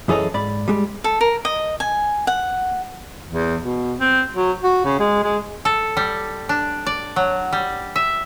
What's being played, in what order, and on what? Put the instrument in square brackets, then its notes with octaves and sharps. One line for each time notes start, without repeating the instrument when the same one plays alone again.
[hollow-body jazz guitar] F#2 E3 G#4 A4 C#5 D#5
G#2 D5 B5
G3 G#3
[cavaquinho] A4
A#4
D#5
G#5
F#5
[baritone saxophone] E2
B2
C4
F#3
F#4
C#3
G#3
G#3
[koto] A4
G3
D4
D5
F#3
G3
E5